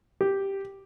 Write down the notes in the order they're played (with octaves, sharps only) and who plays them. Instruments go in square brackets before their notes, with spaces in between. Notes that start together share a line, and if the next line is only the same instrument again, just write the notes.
[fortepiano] G4